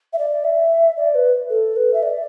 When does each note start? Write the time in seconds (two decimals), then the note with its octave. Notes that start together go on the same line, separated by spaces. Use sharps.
0.13 E5
0.18 D5
0.44 E5
0.97 D5
1.14 B4
1.49 A4
1.76 B4
1.93 E5
2.02 D5